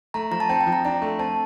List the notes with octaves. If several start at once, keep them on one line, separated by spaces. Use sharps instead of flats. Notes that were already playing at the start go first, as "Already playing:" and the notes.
A3 A#5
F3 A#5
A5
C4 G5
G5
F3
A#5
D4 A#5
A3
C4 A5